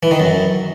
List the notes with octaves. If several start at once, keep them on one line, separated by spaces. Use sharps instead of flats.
E3
D#3
F#2